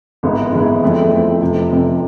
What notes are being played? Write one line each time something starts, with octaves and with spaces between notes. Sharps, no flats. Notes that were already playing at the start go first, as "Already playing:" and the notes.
G#1 G#2 E3 G#3 B3
G#1 G#2 E3 G#3 B3
F2 E3 A3 C4
F2 E3 A3 C4
F1 F2 C3
F1 F2 C3